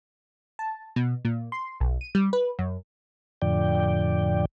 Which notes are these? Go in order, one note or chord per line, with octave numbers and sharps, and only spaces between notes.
A5
B2
A#2
C6
B1
D#7
G3
B4
F#2
F2 A2 D3 F3 D5 G5